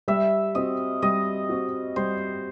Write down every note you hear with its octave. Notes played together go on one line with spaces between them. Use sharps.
G3 E5
C4 F#4 D#5
G3 D#5
C4 F#4
G3 C5